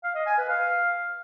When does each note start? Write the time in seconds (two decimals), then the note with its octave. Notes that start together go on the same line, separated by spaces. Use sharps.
0.03 F5
0.15 D#5
0.26 G#5
0.38 B4
0.49 F5